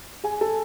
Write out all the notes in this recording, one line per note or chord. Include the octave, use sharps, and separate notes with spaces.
G#4 G#5
A4 A5